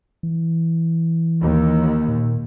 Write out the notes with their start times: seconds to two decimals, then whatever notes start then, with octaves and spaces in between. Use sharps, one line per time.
0.23 E3
1.41 D#2
2.08 A#2